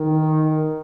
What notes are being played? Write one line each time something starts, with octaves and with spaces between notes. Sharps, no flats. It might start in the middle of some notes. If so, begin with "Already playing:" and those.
Already playing: D#3